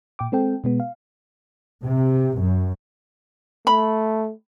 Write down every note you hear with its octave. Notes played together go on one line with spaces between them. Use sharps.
A#2 G5 D6
G#3 C4 A4 G5
B2 G#3 B3
F5
C3
F#2
A3 B5